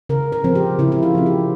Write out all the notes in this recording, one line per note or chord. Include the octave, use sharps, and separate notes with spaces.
C#3 A#4
A#4
F3 C4
G4
C#3 E4
E4
F4
F3 C4
G4